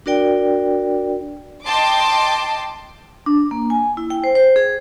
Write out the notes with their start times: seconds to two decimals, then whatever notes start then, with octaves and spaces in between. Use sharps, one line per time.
0.06 D4 F#4 A#4 D5 G5
1.65 D#5 G5 A5 C6 D6
3.26 D4
3.51 A#3
3.70 G#5
3.97 E4
4.10 G5
4.24 C5
4.35 C5
4.56 G#4